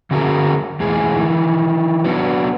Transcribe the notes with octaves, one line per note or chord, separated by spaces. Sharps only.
D3 C#4 F#4 G#4 A#4
E2 A2 G#3 G#4
D#3 E3
F#3 B3 D4